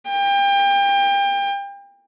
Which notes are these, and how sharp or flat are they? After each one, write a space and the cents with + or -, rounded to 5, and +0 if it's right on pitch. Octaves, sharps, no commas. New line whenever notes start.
G5 +30